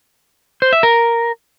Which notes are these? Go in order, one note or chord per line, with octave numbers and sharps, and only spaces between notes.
C5
E5
A#4